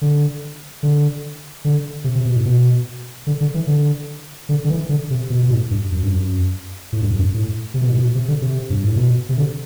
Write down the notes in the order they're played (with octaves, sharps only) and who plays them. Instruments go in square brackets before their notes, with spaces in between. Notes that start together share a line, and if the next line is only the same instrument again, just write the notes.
[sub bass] D3
D3
D3
C3
C3
B2
A2
B2
D3
D3
E3
D3
D3
D3
E3
D3
C3
B2
B2
A2
G2
F#2
G2
F#2
A2
G2
F#2
G2
A2
C3
B2
A2
B2
C3
D3
C3
G2
A2
B2
C3
D3